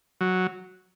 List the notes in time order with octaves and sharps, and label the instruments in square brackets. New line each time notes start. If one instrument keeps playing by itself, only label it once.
[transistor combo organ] F#3